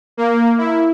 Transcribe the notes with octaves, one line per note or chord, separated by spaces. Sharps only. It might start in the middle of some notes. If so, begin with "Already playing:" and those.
A#3
E4